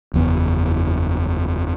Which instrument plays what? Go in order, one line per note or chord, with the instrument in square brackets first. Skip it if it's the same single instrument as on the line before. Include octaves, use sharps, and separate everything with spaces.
[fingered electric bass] F#1 E2 B3